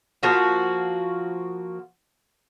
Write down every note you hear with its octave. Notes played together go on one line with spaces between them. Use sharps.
F3 A#3 F#4 F5